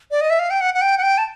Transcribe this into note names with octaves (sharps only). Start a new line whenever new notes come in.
D5
D#5
E5
F5
G5
F#5
F#5
G5
F#5
G5
A5